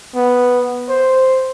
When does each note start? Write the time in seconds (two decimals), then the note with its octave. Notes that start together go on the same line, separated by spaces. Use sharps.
0.16 B3
0.89 C5